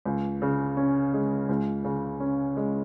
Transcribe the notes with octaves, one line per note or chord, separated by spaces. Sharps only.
C#2
C#3
C#4
G#3
C#2
C#3
C#4
G#3